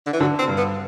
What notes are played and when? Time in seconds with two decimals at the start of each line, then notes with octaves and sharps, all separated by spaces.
0.07 D3
0.13 E3
0.20 D3 F#3
0.39 C4
0.48 G2
0.58 B3